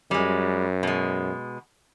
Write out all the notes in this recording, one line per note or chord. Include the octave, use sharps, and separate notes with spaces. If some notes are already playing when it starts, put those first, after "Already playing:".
F#2 G3 G#3
B2 G#3